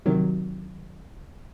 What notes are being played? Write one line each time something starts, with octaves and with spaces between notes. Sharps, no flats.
C3 D#3 F#3